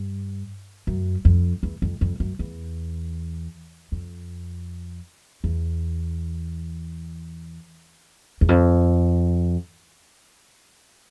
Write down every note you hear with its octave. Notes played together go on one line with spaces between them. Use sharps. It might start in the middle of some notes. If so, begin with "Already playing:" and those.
Already playing: G2
F#2
F2
E2
F2
F2
F#2
E2
F2
E2
E2
F2